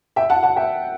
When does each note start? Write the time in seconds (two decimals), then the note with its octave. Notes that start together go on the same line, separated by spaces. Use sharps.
0.16 E5 G5
0.30 F#5 A5
0.43 F#5 A5
0.56 E5 G5